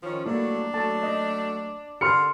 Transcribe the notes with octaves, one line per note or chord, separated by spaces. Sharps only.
D#3 F3 C#4
F#3 G3 A3 A#3 D4 E4
F#3 A3 A5
D#5
D3 G4 A#4 C6 F6 C#7